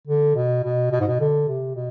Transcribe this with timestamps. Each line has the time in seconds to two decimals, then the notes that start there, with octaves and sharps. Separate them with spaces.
0.07 D3
0.35 B2
0.63 B2
0.91 B2
1.00 G#2
1.07 B2
1.20 D3
1.48 C3
1.75 B2